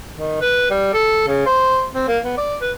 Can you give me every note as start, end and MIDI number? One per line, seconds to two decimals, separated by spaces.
0.16 0.38 51
0.41 0.67 71
0.71 0.90 55
0.94 1.27 69
1.28 1.43 49
1.46 1.87 72
1.94 2.07 60
2.08 2.18 58
2.24 2.37 59
2.38 2.55 74
2.62 2.72 71